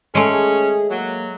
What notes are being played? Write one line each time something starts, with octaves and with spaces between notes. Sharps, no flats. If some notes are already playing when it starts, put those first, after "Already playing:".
G#3 A3 C#4 G#4
F#3 A#3